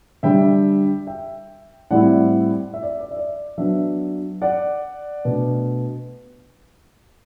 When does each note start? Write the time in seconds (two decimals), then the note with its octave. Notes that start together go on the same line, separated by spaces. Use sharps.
0.23 D3 G3 D4 E5 G5
1.07 E5 G5
1.90 A2 G3 C4 E4 D5 F#5
2.74 E5
2.83 D5
3.00 D5
3.11 E5
3.17 D5
3.58 F#3 B3 D4 E5
4.42 D5 F#5
5.25 B2 A3 D4